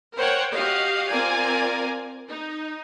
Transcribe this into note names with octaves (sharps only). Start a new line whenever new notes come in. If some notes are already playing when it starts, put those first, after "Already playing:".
A#4 C5 C#5 F#5 G5
F#4 G4 D#5 F5
C4 F4 A#4 D5 G#5 A#5
D#4